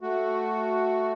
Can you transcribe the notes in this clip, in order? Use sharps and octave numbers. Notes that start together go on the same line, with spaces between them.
A3 F#4